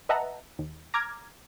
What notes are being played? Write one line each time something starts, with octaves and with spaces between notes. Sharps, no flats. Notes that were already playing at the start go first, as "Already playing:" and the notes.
B4 D#5 E5 F#5 A5 A#5
D#2
A#5 D6 F6 G#6